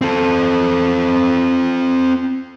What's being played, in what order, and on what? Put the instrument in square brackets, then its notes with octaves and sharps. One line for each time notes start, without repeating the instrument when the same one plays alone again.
[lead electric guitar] C4 A4